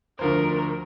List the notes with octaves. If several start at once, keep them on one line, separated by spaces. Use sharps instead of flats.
D2 F3 A#4 C5